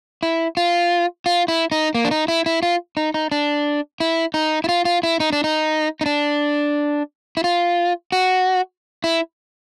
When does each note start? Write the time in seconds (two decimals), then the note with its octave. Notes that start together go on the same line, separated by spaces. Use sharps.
0.23 E4
0.57 F4
1.26 F4
1.48 E4
1.72 D#4
1.95 A#3
2.05 D4
2.11 D#4
2.28 E4
2.46 E4
2.63 F4
2.97 D#4
3.14 D#4
3.32 D4
4.00 E4
4.34 D#4
4.64 E4
4.69 F4
4.85 F4
5.03 E4
5.20 D#4
5.33 D4
5.44 D#4
6.01 D#4
6.06 D4
7.37 E4
7.44 F4
8.12 F#4
9.04 E4